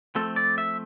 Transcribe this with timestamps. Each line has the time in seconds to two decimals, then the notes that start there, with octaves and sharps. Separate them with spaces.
0.15 F3 A3 C4 A4
0.36 D5
0.58 E5